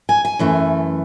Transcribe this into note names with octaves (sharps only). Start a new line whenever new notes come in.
G#5
G#5
F#2 E3 A3